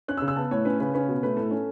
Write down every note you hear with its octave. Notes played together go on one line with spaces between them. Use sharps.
C#4 F#6
E6
C#3
E6
B3 A5
A2 C#5
C#4 B4
C#3 B4
C#4 B4
B2
A3 B4
A2 A4
C#4